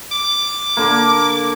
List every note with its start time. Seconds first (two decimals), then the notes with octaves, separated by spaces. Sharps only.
0.11 D6
0.77 D3 A#3